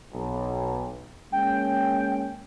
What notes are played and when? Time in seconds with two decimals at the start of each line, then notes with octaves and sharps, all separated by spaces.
0.13 B1
1.32 G#3 A#3 C#4 G5